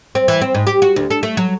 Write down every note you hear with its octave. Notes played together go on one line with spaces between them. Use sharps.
C4
E3
C4
G#2
G4
F#4
D2
A4
A3
F#3